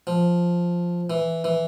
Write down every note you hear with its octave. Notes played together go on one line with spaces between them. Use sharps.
F3
E3
E3